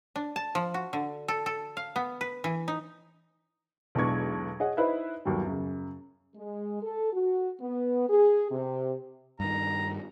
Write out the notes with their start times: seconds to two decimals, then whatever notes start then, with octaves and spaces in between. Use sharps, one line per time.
0.16 D4
0.36 A5
0.55 F3
0.74 F#4
0.93 D3
1.28 A4
1.46 A4
1.77 F5
1.96 B3
2.21 B4
2.44 E3
2.68 D#4
3.95 B1 E2 G#3 D4 C#6 G#6
4.60 G#4 C#5 D#5 F#5
4.77 D#4 E4 B4 C5 D#5 E5
5.25 G1 D#2 F#3 G3
5.44 F#2 C#3
6.36 G#3
6.83 A4
7.13 F#4
7.61 B3
8.09 G#4
8.51 C3
9.40 G2 D#3 A#5